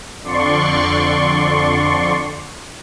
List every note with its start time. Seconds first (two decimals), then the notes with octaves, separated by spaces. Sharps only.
0.24 F2 D3 D5 C6 C#6